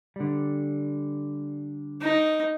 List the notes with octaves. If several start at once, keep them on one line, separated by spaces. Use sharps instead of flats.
D3 G3
D#4